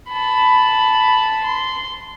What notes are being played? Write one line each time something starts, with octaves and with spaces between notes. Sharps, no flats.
A5 B5
C6